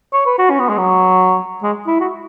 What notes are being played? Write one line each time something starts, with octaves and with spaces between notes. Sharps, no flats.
C#5
B4
F#4
C#4
B3
G#3
F#3
G#3
E4
F#4